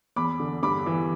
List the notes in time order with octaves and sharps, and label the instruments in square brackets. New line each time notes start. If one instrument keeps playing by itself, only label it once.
[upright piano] E2 B5 D6
D3
G2 B5 D6
E3